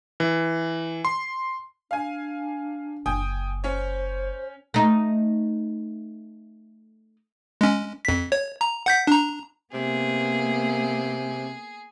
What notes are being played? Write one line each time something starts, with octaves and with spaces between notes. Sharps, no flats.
E3
C6
D4 F5 G#5
F#1 G5 G#5 D#6
C#4 C5 C#5
A3 D#4
G#3 C#4
F2 B6
C#5
A#5
F#5 G6 B6
D4 A#5
C3 A#3 B3 G#4